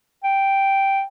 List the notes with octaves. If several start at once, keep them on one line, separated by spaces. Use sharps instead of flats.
G5